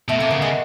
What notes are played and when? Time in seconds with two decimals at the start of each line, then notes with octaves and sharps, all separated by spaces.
0.08 B2 A3
0.19 C3 A#3
0.30 C#3 B3
0.41 C#3 G#3